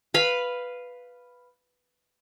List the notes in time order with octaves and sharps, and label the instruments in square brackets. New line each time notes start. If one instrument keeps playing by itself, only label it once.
[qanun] B4 F5 B5